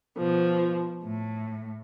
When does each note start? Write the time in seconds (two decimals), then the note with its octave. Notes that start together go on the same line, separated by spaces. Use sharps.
0.17 B2 F3
1.03 A2